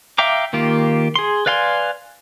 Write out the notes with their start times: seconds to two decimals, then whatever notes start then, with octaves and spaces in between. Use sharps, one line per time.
0.18 E5 F5 G5 A#5 D6
0.53 D#3 A#3 F4 G4
1.16 G#4 C6
1.46 B4 D5 F5 G#5 C6